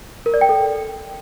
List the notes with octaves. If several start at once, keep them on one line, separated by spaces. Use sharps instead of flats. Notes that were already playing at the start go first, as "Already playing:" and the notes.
A#4
D5
G5
A4